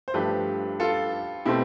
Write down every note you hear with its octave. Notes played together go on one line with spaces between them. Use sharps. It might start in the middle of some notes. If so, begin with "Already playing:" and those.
C5
G2 F3 A3 D4 G4 B4
F4 A4
B2 A3 C4 E4 G4